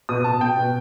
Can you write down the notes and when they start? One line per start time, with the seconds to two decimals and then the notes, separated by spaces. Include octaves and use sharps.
0.09 B2 D#6
0.24 B2 A5
0.41 B2 G5
0.57 B2